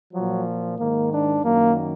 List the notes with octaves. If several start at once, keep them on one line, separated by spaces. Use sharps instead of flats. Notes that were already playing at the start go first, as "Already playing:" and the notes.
F3 F#3
A#2
G#2 D#3 A#3
D4
F#2 D#3 A#3